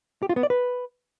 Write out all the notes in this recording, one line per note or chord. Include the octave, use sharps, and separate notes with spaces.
G4
F4
B3
D5
B4